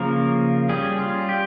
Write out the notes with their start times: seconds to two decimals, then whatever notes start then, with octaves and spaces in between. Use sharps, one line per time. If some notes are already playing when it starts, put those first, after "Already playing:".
Already playing: C#3 F3 A#3 A#4
0.69 G3 C#4 G#4
0.99 F4
1.29 G4